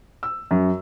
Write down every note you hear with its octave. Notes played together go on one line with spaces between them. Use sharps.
E6
F#2